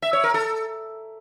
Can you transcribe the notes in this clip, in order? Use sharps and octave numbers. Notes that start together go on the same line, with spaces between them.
E5
C#5
A#4
A4